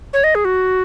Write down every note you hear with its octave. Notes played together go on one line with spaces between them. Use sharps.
C#5
D#5
G#4
F#4